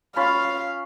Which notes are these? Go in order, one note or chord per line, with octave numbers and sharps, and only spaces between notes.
C#4 F4 F5 B5